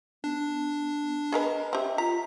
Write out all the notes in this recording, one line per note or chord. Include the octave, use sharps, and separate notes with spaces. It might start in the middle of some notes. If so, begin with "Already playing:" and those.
B3 D4
G#4 A#4 B4 D#5
C4 G4 E5
F4 A#5 B6